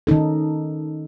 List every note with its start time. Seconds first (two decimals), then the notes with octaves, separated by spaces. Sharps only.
0.07 D#3 C#4 D#4 A4